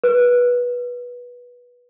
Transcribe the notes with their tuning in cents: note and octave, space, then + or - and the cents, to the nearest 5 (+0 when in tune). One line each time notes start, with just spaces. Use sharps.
B4 -15